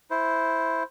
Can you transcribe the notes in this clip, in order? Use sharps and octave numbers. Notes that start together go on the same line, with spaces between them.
E4 C5